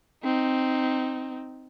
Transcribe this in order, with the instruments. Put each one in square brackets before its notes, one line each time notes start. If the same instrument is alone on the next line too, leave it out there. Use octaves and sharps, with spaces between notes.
[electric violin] C4 D#4